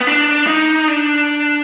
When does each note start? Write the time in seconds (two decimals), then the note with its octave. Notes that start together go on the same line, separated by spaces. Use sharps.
0.01 B3
0.07 D4
0.47 D#4
0.88 D4